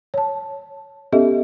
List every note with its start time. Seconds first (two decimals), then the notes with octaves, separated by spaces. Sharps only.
0.14 C#5 A5
1.12 B3 C#4 G4 A4 D#5 E5